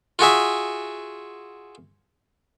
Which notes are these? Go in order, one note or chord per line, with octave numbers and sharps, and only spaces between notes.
F4 F#4 G#4 E5